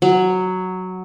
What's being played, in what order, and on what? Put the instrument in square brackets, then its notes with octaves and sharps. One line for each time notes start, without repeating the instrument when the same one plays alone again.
[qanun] F#3